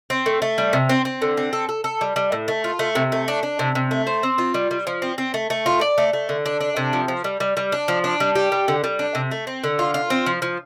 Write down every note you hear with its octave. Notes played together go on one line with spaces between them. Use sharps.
C4
A3
A3
G3
C3
C4
C4
D3
C4
A4
A4
A4
G3
G3
A2
A3
F4
A3
C3
A3
D4
D4
C3
C3
A3
C5
C4
F4
G3
G3
F3
C4
C4
A3
A3
F4
D5
A3
A3
D3
D4
D4
C3
F3
F3
G3
G3
G3
D4
F3
D4
G3
G4
G3
D3
G3
D4
C3
A3
C4
D3
F4
F4
C4
F3
F3